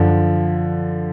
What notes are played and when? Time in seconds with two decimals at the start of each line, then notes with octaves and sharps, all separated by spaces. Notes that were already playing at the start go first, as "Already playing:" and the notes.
Already playing: F#2 D3 F3